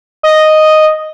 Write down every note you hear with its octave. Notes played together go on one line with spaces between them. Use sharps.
D#5